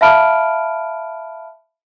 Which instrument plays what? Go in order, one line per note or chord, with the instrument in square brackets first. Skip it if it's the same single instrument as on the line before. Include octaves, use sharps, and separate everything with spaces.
[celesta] E5 F5 A5 B5 F6 D7